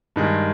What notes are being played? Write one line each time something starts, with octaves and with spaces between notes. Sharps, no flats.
G2 D#3 G#3